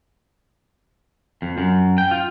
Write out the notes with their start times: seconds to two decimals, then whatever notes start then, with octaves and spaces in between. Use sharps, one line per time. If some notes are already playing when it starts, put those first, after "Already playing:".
1.42 F2
1.58 F#2
1.98 G5
2.11 F4